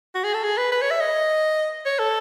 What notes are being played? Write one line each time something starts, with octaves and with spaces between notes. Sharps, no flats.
F#4
G#4
A4
G#4
B4
B4
C#5
E5
D#5
C#5
A4